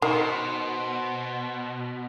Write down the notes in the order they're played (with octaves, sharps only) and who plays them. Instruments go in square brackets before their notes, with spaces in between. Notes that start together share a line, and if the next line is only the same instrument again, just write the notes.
[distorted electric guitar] B2 [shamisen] D#3 [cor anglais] C5